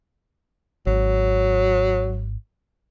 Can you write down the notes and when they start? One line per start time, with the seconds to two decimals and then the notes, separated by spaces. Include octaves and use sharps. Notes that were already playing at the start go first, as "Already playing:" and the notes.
0.87 G#1 F#3